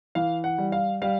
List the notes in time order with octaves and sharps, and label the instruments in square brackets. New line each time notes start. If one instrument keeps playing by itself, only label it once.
[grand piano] E3 F5
F#5
G3
F5
G3 F5